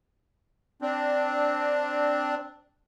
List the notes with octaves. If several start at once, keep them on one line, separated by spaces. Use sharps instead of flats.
C4 D4